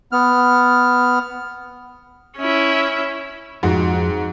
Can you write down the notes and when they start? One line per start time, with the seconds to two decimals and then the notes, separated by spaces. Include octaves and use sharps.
0.12 B3 F6
2.37 C#4 E4
3.63 F2 G#2 F#4